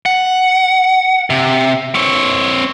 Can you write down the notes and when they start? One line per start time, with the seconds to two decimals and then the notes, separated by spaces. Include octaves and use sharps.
0.06 F#5
1.30 C3
1.95 C4 C#5